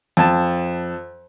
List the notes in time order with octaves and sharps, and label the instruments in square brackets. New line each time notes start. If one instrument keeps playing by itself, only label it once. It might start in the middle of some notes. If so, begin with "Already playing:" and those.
[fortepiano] F2 A5